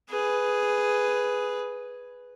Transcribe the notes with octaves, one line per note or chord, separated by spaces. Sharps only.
G#4 B4